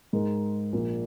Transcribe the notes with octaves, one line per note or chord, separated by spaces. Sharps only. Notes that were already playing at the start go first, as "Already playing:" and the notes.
G#2 G#3 D#4 A#4
A#1 A#2 A#3